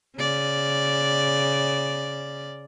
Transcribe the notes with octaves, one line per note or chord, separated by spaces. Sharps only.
C#3 D5